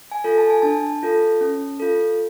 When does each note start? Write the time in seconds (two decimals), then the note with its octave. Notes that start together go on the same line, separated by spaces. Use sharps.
0.11 G#5
0.24 F4 A4
0.38 A5
0.50 G#5
0.62 D4 A5
1.03 F4 A4
1.41 C#4
1.80 F4 A4